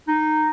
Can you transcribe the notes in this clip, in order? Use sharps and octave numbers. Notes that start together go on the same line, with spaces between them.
D#4